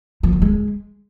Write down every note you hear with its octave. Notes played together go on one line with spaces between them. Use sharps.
F3
F#3
G#3